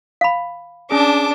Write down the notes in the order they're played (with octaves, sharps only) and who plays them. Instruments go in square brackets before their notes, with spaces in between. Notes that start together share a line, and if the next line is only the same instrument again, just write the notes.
[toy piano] F5 B5
[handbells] C#4 G#4 [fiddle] D4 [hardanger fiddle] A5 D6